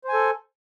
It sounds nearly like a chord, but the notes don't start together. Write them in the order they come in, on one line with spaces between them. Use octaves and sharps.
C5 G#5 A4